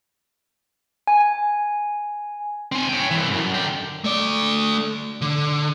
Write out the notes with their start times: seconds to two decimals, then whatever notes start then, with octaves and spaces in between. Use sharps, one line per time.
1.07 G#5
2.72 C4 G#5
2.89 C#5 G5
3.11 C2 E3
3.32 F#2
3.55 D3 G5
4.04 A3 D5
5.21 D3